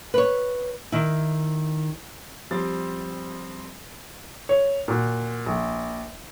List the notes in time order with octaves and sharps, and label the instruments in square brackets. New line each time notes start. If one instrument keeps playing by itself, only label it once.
[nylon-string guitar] B4 C#5
D#3 E4
[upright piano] F3 G3 C4 A6
[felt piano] C#5
A#2 F#4
A#1